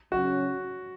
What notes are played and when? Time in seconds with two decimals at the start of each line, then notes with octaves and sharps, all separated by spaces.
0.12 C#3 F#3 C#4 F#4